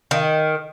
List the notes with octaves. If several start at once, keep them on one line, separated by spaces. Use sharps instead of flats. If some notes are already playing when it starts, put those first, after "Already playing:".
D#3